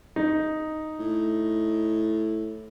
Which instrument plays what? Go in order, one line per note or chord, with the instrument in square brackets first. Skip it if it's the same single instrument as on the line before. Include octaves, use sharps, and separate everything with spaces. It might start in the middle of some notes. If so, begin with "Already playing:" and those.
[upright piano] D#4
[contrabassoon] A2